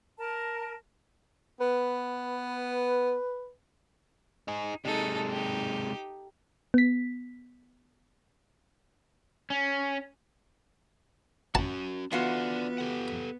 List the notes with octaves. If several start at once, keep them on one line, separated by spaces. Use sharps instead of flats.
A#4 A5
B3 B4
D#4 G#4
C3 G#3 D#4 A4
D#4 G4
B3 B6
C#4
C#4 F#4 A5
E3 B3 D4 F4 F#4 F#5
G4 A4 F#5